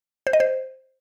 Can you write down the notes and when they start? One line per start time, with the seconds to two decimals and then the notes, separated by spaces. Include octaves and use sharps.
0.27 C5
0.33 D#5
0.40 C5